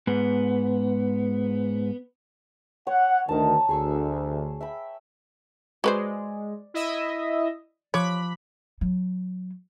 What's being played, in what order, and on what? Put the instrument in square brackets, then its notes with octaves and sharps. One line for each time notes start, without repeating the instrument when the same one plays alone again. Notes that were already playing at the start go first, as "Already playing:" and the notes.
[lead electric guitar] G#2 [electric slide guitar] B3
[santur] C#5 [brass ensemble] F#5
[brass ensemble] D2 D#3 [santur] A5 A#5
[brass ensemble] D2 [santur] G#4 C#6 E6
[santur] E5 G5 B5
[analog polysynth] G#3 [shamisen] F#4 B4 C5 [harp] D5
[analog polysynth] E4 D#5 E5
[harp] F3 D6 F#6 [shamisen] C#5 [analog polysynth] B5
[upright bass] F#3